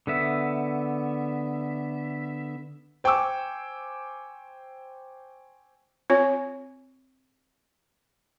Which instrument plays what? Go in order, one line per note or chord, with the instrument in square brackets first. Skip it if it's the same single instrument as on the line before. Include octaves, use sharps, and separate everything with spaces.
[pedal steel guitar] D3 B3 E5
[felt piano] C5 G5 G#5 C#6 D6 E6
[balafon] C4 F4 C#5 G#5